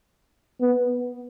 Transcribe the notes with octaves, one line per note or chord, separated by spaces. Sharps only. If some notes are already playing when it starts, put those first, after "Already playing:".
B3